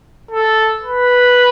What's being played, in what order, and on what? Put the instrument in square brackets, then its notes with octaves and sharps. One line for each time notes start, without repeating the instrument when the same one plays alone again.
[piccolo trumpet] A4
B4